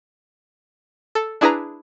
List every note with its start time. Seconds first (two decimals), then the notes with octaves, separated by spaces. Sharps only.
1.15 A4
1.41 D4 E4 G#4 B4 G#5 A#5